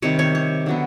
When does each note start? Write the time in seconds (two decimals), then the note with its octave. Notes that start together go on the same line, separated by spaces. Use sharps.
0.02 C3 D#3 G3 C#5
0.19 C#5
0.35 C#5
0.66 D3 F#3 B3